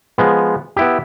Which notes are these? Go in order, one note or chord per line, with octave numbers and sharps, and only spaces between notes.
F3 G#3 B3
B3 E4 G4